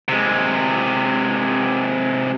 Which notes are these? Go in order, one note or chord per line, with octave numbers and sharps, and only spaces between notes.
C3 G#3